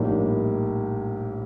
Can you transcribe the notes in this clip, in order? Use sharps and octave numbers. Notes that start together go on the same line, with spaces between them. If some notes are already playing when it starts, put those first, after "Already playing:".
Already playing: A#1 A2 G3 A#3 D#4